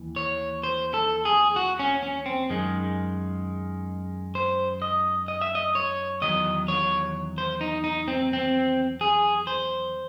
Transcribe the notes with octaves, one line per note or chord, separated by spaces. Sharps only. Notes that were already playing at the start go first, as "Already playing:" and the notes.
Already playing: D#2 E3
C#5
C5
A4
G#4
F#4
C#4
C#4
C4
F#2 D#3 G#3
C5
D#5
D#5
E5
D#5
C#5
E2 D#3 F#3 D#5
C#5
C5
D#4
D#4
C4
C4
G#4
C5